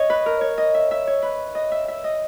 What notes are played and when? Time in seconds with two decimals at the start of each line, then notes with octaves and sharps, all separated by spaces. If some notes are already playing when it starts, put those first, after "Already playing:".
Already playing: C#5 D#5
0.10 B4
0.26 A#4
0.41 C#5
0.58 D#5
0.74 E5
0.91 E5
1.07 C#5
1.22 B4
1.55 D#5
1.72 E5
1.88 E5
2.04 D#5